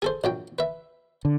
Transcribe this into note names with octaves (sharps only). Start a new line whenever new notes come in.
G#4 A4 C5
A#1 F#3 G5
B4 E5
D3